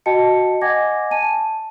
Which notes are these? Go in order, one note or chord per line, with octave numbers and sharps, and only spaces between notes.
F#4 D#5 G5 A5 C#7
D#5 F#5 G#5 D6 G#6 A#6
G#5 A5 D#7
A5